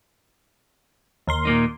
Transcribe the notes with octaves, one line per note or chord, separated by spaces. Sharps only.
D#2 A#4 C6
A#2 A#3 D#4